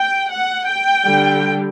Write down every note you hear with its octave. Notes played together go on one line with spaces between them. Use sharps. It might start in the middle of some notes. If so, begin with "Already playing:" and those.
Already playing: G5
F#5
G5
D3 G3